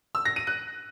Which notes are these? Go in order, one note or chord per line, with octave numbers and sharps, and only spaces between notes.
E6
A#6
D#7
F#6